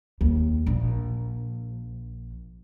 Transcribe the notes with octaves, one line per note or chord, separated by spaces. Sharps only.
D#2
A#1